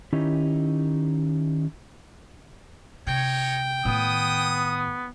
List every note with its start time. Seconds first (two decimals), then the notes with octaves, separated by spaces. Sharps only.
0.13 D#3 C#4 D#4 E4 G4
3.07 C3 D#4 C#5 G5
3.85 A2 D#3 B3 D#6